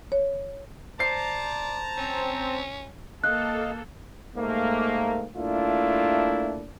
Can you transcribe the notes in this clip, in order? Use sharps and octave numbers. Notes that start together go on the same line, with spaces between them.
C#5
C5 D5 A5 A#5 C7
C4 C#4
A#3 A4 D#5 F5 F#6
G#2 A3 A#3
A3 A#3 D4 E4 F4